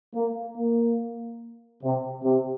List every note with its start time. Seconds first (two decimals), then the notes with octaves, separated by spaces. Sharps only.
0.15 A#3
0.58 A#3
1.83 C3
2.24 C3